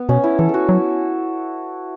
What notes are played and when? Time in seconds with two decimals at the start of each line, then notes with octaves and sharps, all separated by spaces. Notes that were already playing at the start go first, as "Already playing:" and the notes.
Already playing: B3
0.09 B2 C#4
0.24 E4
0.39 E3 A4
0.49 F#4 A4
0.69 F#3